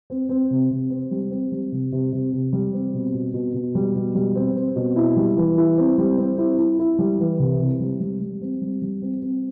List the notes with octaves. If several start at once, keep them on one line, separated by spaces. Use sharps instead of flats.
C4
C4
C3
C3
C4
G3
C4
G3
C3
C3
C3
C3
G3
C4
B2
B2
B2
B2
G3
B2
G3
C4
C4
B2
E4
G3
E3
E4
C4
G3
C4
E4
E4
E4
G3
E3
C2
C3
G3
G3
G3
C4
G3
G3
C4
C4